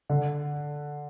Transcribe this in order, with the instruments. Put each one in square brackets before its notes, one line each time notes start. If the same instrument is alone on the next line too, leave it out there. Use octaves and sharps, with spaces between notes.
[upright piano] D3